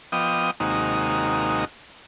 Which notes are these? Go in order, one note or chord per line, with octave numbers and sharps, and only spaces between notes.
F3 B3 D#5 G5 D6 D#6
D#2 C3 G#3 A#3 D#4 F#4